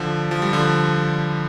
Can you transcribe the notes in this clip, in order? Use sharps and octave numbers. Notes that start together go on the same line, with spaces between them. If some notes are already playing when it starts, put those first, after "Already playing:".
Already playing: D3 F3
F3
G3
D3 F3